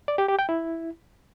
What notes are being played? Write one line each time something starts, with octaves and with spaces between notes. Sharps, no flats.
D5
G4
G4
G5
E4